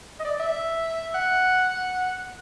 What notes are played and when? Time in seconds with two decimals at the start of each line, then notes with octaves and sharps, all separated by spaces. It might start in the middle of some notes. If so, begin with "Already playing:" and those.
0.19 D#5
0.25 D5
0.40 E5
1.15 F#5